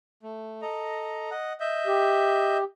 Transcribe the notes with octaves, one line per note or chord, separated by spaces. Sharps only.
A3
A4 D#5 A#5
D#5 F#5
D#5 E5 G6
G4